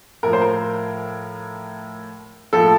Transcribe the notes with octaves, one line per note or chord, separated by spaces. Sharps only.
A2 F3 A#4
C5
A#4
A2 F3 A4